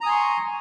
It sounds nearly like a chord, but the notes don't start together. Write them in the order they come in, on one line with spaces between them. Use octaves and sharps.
A#5 D#6 G#5 C6 C#6